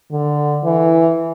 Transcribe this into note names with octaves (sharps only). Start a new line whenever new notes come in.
D3
E3